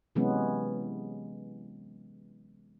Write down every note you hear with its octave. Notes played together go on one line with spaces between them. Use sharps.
C3 E3 F#3 G#3 B3 C#4